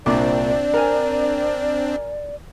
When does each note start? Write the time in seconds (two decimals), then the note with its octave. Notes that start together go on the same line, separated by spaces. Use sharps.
0.06 C2 A#2 C4 D4 D5 D6
0.74 A#4 G#5